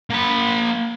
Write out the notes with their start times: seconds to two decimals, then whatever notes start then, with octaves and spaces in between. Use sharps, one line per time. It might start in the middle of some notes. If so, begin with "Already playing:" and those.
0.10 A#3 B5